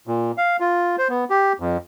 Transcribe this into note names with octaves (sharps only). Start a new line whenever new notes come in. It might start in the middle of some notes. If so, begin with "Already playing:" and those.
A#2
F5
F4
C5
B3
G4
F2